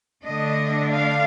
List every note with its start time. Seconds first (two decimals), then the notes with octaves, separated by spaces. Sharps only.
0.24 D3 A3 D4 D#5
0.91 F5